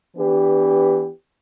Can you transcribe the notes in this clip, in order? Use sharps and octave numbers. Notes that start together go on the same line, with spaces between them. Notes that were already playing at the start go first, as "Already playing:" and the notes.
E3 B3 D4 G4